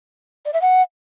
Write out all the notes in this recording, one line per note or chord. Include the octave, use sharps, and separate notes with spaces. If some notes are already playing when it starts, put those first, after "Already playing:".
D5
E5
F#5